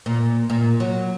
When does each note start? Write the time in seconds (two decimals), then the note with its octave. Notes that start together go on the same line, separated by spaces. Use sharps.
0.06 A#2
0.50 A#2
0.80 F#3